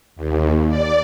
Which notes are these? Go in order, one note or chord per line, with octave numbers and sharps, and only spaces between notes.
D#2
D5